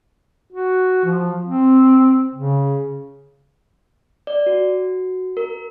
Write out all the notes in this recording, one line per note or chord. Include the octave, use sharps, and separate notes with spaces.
F#4
F3
C4
C#3
D5
F#4
A#4